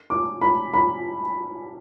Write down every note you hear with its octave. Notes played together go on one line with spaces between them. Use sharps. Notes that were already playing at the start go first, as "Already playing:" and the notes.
D6
B5
B5